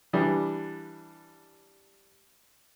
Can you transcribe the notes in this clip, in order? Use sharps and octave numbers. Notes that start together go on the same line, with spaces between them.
E3 G3 D4